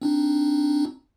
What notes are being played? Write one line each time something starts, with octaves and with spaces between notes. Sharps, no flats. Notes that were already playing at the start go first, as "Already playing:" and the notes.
C4 D4 D#4